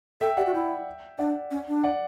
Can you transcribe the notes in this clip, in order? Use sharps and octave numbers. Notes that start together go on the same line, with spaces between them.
A4 E5 G5
G4 D5 F#5
F#4
E4 E5 G5
D4 D5 F#5
C#4
D4
D5 F#5